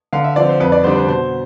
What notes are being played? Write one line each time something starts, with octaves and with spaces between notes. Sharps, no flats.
D3 F5
E5
F3 C4 D5
C5
F2 B4
D5
D3 G3 D4 C5
C5
B2 C5